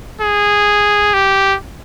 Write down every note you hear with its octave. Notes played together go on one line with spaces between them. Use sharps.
G#4
G4